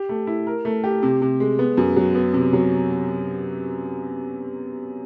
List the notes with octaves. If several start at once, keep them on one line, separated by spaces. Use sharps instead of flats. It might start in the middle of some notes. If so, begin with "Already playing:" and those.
Already playing: G4
A3
E4
A#4
A3
G4
C3
C3
G#3
B3
F#2
F#3
B3
C3
F#3